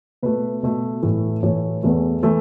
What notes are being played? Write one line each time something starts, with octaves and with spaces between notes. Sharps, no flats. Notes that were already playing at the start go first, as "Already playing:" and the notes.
B2 A3 B4
B2 A3
A2 E3 A3
A2 E3 A3 C#5
E2 E3 A3
E3 A3 A4